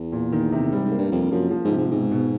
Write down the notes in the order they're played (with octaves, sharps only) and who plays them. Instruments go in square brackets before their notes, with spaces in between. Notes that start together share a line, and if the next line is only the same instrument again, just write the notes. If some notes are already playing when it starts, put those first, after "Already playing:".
Already playing: [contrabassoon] E2
[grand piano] A#2
D#3
C3
[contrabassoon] G#2 [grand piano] G3
[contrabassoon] G#2
[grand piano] A#3
[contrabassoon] G2
[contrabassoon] F2 [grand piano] A#3
[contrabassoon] F#2 [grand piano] F3
[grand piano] F3
[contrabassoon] G#2
[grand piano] C3
[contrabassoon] G#2
[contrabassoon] G#2 [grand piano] B2
[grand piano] B2